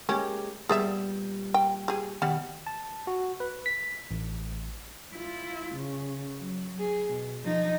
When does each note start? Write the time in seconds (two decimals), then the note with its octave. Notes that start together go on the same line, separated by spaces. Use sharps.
0.09 G#3 A#3 C#4 G4
0.69 A#2 G3 B3 G#4 D5 E5
1.54 G5
1.88 G4 G#4
2.22 B2 D#3 G3 F#5
2.67 A5
3.07 F#4
3.40 B4
3.66 B6
4.11 A1
5.15 E4 F4
5.75 C#3
6.39 F#3
6.78 G#4
7.09 B2
7.42 F3 D#4